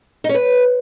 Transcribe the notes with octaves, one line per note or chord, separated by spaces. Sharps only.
D#4
C#4
B4